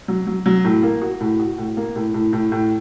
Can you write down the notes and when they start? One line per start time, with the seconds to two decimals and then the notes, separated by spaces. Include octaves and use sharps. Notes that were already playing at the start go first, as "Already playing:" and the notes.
0.08 F#3
0.27 F#3
0.46 F#3
0.65 A2
0.83 A#3
1.02 F#4
1.20 A2
1.40 F#4
1.58 A2
1.77 A#3
1.96 A2
2.14 A2
2.33 A2
2.52 A2